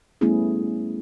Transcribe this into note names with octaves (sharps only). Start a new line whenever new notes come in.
G3 A3 B3 C#4 E4 G#4